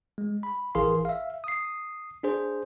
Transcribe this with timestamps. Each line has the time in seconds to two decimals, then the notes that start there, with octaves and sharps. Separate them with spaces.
0.18 G#3
0.43 B5
0.75 A1 E3 G#4 A#4 F5 C6
1.05 E5 F5
1.44 D#6 C7
2.23 D4 G#4 C5